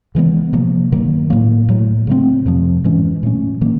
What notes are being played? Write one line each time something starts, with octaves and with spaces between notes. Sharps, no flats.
C#3 E3 G#3 B3
C3 F3 A#3
G2 D#3 F#3 A#3
A2 F#3 A#3
A2 F#3 A3
C#3 F#3 A3 C4
F2 C3 F3
G#2 E3 G#3 C#4
A#2 F#3 A3 C#4
D#3 F#3 A#3